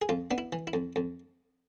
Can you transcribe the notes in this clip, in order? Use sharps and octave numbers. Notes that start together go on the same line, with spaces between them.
G#4
F2 F4
B3 D4
E4
E3
E4
F2
F2